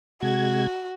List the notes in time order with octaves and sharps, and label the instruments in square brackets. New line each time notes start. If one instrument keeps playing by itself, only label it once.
[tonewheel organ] C3 G#3 G#6 [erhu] F#4